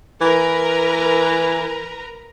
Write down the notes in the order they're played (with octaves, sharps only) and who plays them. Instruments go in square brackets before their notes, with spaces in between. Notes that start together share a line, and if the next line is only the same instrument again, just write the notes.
[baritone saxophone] E3 [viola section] A#4 B4 A#5